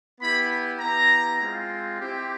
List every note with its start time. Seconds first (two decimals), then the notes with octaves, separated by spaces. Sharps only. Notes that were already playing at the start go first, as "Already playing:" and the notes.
0.21 B3 E4 G4 B5
0.80 B3 E4 G4 A#5
1.40 G#3 C4 F4
1.99 C4 E4 G4